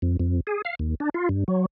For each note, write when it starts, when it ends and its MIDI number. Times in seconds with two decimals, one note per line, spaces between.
0.02 0.17 41
0.20 0.40 41
0.47 0.62 68
0.65 0.75 77
0.79 0.95 39
1.00 1.09 62
1.14 1.29 65
1.29 1.44 43
1.48 1.66 54